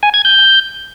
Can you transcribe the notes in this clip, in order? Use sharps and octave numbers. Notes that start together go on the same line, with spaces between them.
G#5
G#6
G6